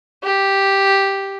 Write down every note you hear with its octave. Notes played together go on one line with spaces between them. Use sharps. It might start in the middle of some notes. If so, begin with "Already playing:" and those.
G4